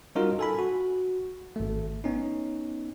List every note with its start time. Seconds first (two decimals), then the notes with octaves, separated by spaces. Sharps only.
0.15 G3 C#4 D#4 F4 F#4 A#4
0.39 A4 G#5 B5
0.58 F#4
1.56 G#1 A3
2.04 B3 C#4 D#4